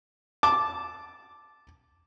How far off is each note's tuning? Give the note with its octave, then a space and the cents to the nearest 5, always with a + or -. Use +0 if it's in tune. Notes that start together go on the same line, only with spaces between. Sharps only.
A5 -10 D6 +0